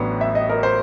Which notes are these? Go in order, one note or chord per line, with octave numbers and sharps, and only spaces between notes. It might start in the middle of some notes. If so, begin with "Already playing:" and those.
Already playing: A1 A2 F#3 B3 D4
E5
D#5
A#4
C5